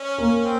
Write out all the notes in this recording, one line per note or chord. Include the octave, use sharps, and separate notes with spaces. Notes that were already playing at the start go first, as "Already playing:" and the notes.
Already playing: C#4
A#3
C4